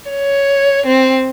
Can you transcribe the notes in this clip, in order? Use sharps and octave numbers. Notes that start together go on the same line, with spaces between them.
C#5
C4